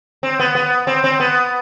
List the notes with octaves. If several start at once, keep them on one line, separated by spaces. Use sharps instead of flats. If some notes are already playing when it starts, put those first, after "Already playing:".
C4
B3
B3
C4
C4
B3